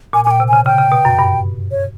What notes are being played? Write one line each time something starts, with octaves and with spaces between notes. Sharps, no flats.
A#2 G#5
G#5
A#2 G5
C3
C#3 G#5
C#3 G5
C#3
B2
F#2
G2
C#5